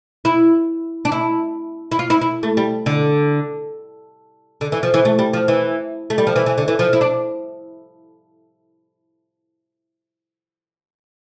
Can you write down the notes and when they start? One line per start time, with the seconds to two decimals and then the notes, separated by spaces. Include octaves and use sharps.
0.25 E4
1.05 D4
1.12 E4
1.92 E4
1.99 F4
2.10 E4
2.21 E4
2.43 A3
2.57 G3
2.86 D3
4.61 D3
4.72 E3
4.83 F3
4.94 E3
5.05 A3
5.19 G3
5.33 F3
5.48 E3
6.10 A3
6.18 G3
6.27 F3
6.36 E3
6.46 E3
6.58 D3
6.68 E3
6.79 F3
6.93 E4
7.01 D4